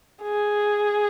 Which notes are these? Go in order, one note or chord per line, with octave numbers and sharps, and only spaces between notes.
G#4